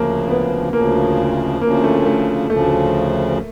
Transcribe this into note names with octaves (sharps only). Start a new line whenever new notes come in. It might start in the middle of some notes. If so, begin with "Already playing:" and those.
Already playing: D2 C#3 F3 A#3
B3
D2 C#3 F3 A#3
D2 C#3 F3 A#3
A3
A3
D2 C#3 F3 A3